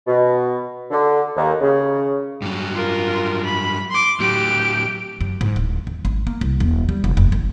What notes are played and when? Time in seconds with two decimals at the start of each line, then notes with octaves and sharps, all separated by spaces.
0.07 B2
0.91 D3
1.36 D#2
1.61 C#3
2.42 G2 F#3
2.75 F4 A#4
3.45 B5
3.91 C6 D6
4.20 A2 F#3 G4 D7
5.21 F#2
5.41 G#2
5.56 D1
5.87 D#2
6.05 G#1
6.27 A#3
6.41 C2
6.60 D#1
6.89 G3
7.04 F1
7.17 F1
7.32 G#1